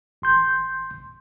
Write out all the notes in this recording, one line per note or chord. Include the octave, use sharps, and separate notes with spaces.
A1 C6 G6